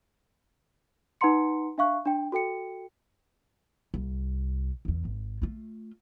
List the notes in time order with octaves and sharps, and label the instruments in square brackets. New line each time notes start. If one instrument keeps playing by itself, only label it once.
[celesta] D#4 B4 F#5 A#5 C6 C#7
D4 E5 F5 C#6 F#6
D4 G5
F#4 A4 G5 C#7
[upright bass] C2
F1 E2
G#1
A3 F4